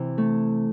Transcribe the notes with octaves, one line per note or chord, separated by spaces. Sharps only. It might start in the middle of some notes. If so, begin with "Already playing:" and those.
Already playing: C3 E3
A3